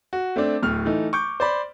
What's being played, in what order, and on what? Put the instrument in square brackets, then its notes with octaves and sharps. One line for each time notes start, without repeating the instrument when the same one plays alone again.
[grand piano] F#4
A3 C4 D4
D1 A2 F6
E3 A3 D#4
C#6 D6 G6
C5 D5 B5